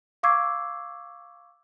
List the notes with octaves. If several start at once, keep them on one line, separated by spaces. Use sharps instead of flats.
F5 C#6 D6 E6 G#6 C7